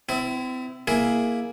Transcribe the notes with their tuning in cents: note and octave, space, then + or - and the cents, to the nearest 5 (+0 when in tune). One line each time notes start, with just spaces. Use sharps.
C4 -40 E4 +5
A#3 +5 E4 +0 G#4 +0